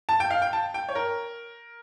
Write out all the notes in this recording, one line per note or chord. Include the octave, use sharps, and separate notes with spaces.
A5
G5
F5
G5
A5
G5
C#5
A#4